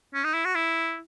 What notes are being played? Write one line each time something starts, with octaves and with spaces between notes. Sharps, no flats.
C#4
D#4
E4
F#4
E4